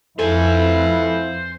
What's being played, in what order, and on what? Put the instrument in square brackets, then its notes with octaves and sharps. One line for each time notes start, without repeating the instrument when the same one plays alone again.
[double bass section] F2 [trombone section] E4 F4 B4 [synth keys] A4 [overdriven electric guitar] C5 G#5